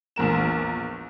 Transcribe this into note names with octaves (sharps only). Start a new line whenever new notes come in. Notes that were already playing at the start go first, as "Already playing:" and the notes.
A#1 E2 A#4 E7